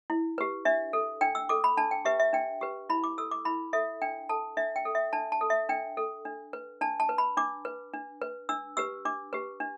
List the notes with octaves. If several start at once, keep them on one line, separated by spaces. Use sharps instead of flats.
E4
G4 B4
D4 E5
A4
D4 G5
E6
A4 D6
B5
D4 A5
G5
G4 B4 E5
E5
D4 G5
G4 B4
E4 B5
D6
A4 E6
D6
E4 B5
A4 E5
D4 G5
A4 A5
D4 E5
G5
A4
E5
D4 A5
A5
A4
E5
D4 G5
A4
D4
B4
D4 A5
A5
B4
B5
D4 D6
B4
D4
B4
D4 E6
G4 B4 E6
D4 D6
G4 B4
D4